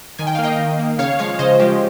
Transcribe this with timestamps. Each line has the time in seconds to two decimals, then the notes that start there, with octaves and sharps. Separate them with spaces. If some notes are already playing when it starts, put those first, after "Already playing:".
0.19 D#3 G#5
0.27 G5
0.35 F5
0.39 A#3
0.44 D#5 G5
0.59 D#3
0.79 A#3
0.99 C#3 C#5 F5
1.19 F3 G#3 C#5 F5
1.39 C#3 C5 D#5
1.59 F3 G#3 G4